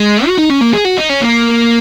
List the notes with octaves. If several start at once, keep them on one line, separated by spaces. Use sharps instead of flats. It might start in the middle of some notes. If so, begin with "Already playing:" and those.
Already playing: G#3
F#4
D#4
C#4
A#3
G#4
F#4
D#4
C#4
A#3